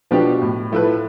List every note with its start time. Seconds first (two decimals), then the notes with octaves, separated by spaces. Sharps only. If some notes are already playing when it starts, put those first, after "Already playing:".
0.11 B2 F3 B3 D4 G4
0.42 A2
0.72 F3 A3 E4 B4